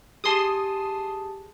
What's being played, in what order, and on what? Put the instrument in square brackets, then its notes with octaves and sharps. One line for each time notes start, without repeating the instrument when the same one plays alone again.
[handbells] G4 G#4 A5 [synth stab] C6 D#6